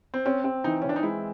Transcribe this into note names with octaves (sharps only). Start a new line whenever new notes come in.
C4
C4 C#4
C4
E3 D#4
C#4
E3
D4
D#4
G#3 E4